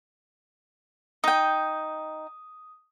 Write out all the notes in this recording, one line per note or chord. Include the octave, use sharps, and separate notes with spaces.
D#4 G5 D#6